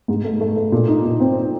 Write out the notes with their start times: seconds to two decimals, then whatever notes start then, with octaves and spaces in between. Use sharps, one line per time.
0.08 G#2
0.24 A3
0.41 A3
0.56 A3
0.72 A#2
0.88 D#4
1.04 A#2
1.20 C4